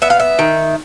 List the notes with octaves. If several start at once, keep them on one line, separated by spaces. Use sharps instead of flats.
B3 E5
F5
E5
D#3